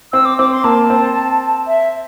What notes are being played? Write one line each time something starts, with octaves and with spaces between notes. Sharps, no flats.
C4 E6
D6
C4 D6
C6
A#3 A5
C4
E5